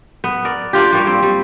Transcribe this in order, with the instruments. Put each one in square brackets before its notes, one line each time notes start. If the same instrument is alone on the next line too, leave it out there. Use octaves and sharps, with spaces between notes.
[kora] B3
A#4 D5
A#3 D4 F4 G4
G3 A#3 C#5
C4
G3